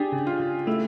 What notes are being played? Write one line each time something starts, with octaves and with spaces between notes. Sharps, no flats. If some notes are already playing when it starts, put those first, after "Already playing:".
Already playing: D4 G4 G#4
C#3
F4
C#3
A3 E4